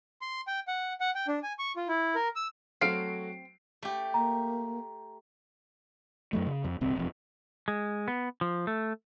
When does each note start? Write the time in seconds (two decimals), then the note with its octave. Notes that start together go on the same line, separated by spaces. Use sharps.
0.21 C6
0.47 G5
0.68 F#5
1.00 F#5
1.15 G5
1.28 D4
1.43 G#5
1.59 C#6
1.76 F4
1.88 E4
2.15 A#4
2.36 E6
2.81 F#3 A3 C4 F#4 F5 C7 D7
3.83 A3 G4
4.14 A#3 A#5
6.33 F#2 F#3 A3
6.47 C#3
6.64 F2
6.81 D#1 C2 C4
6.96 E1 F2
7.68 G#3
8.08 B3
8.41 F3
8.67 A3